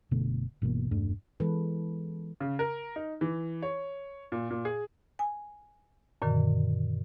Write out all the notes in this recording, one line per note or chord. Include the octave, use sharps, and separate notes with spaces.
F#1 B2 D3 A3
G1 B2 E3 A#3
E1 G2 A3 D4
E3 G#3 B3 A4 B4
C#3
A#4
D#4
E3
C#5
A#2
A#2
G#4
G#5
F#2 A#2 D3 D#3